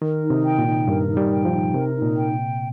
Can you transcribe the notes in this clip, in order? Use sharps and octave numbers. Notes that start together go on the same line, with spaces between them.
D#3 A#4
D#4
C3
G5
A#2
D#4
G2 A#4
D#4
G3
G5
F3
D#4
C3 A#4
D#4
A#2
G5